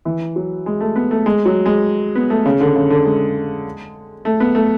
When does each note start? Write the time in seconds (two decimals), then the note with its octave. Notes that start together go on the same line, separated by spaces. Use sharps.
0.05 E3
0.36 F#3
0.66 G#3
0.81 A3
0.96 B3
1.11 A3
1.26 G#3
1.45 F#3
1.66 G#3
2.15 B3
2.30 A3
2.46 C#3
2.60 D3
2.75 C#3
2.90 D3
3.05 G#3
4.25 A3
4.40 B3
4.55 A3